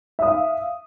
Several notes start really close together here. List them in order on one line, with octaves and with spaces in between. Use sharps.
E5 D#6 F5